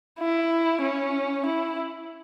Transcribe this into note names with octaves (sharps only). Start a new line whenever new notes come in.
E4
C#4
E4